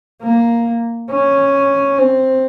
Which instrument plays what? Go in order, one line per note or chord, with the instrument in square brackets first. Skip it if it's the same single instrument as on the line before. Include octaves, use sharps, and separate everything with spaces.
[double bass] A#3
C#4
C4